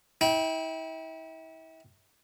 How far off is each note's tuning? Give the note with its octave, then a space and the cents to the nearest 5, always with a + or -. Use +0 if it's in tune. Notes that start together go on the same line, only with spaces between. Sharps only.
E4 -35 G5 +0